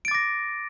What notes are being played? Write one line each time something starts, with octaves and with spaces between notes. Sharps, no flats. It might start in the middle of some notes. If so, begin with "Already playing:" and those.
D6 A6 A#6 D7